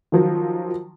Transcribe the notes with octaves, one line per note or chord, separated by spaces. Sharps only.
D#3 F3 F#3